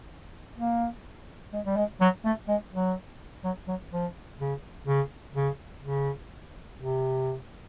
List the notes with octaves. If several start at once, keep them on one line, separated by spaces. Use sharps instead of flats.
A#3
G#3
G3
G#3
F#3
A3
G#3
F#3
F#3
F#3
F3
C#3
C#3
C#3
C#3
C3